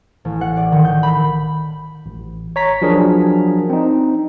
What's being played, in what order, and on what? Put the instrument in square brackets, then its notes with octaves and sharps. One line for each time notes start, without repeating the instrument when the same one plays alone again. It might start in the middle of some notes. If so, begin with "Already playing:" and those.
[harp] A1
F#5
D5
D#3
G6
B5
[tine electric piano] A1
C#5 A#5 B6
F3 F#3 D4 G#4 A#4
C4 D#4